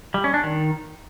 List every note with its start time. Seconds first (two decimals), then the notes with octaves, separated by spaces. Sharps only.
0.14 G3
0.24 C#4
0.34 D4
0.43 D#3